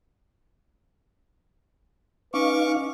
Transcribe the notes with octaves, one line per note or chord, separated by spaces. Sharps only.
C#4 D#4 B4 F5 C#6 D6